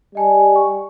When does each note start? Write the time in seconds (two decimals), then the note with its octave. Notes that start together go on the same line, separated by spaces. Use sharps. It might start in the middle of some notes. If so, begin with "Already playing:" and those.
0.15 G3 D#5 G#5 A5
0.54 G5 C#6